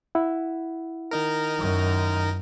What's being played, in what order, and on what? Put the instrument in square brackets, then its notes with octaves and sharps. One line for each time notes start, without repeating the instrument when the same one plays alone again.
[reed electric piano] E4 F#5
[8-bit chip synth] D#3 D#4 A#4
[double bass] F#2